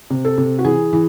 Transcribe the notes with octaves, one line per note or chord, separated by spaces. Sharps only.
C3
A4
C3
F#4
E3 G#4
E3